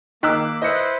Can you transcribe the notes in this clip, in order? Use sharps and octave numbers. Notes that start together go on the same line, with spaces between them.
D#3 A#3 D6 E6 F#6 B6
E4 B4 C5 D#5 C#7